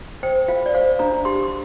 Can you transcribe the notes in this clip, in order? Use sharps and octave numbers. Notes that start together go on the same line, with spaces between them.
C5 G5
F4 F5
D5
C5 F5
D4 A#5
G4 C6
C6